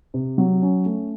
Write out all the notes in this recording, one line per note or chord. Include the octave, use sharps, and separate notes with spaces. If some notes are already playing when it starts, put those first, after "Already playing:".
C3
F#3
C#4
A3